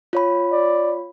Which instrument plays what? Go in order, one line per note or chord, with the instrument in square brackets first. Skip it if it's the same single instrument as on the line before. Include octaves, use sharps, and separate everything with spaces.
[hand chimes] F4 C#5 B5
[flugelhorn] D5